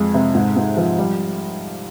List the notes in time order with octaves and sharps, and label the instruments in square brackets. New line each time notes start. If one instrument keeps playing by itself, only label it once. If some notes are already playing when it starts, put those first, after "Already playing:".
Already playing: [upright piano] F2 F3 G#3
C3
G#2
G#2
F3
G3